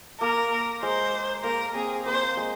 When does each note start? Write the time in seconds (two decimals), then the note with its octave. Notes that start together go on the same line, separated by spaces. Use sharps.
0.21 A#3 A#4
0.83 G#3 C5
1.43 A#3 A#4
1.75 C4 G#4
2.06 A#3 C5
2.37 G#3